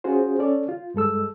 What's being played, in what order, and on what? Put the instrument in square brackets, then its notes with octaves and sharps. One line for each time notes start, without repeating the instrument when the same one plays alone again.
[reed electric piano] C#4 F4 F#4 G#4 C5
C#4 A4 C#5 D5
F4
G2 G#3 A4 E6